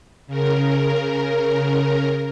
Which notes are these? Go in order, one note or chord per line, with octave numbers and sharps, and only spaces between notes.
C#3 A#4